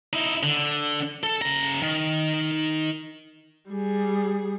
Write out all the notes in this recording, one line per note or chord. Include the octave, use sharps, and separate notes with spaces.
D#4 E4
D3
A4
C#3 A#5
D#3
G3 G#4